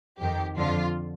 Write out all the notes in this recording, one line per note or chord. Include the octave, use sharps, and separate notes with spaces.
F2 D#3 G4
F2 D3 F3 F4